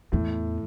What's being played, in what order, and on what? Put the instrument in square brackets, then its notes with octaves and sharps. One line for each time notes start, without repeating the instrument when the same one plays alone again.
[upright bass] E2 [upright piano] A2